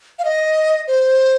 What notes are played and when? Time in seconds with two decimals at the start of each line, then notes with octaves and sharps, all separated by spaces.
0.19 F5
0.25 D#5
0.88 C5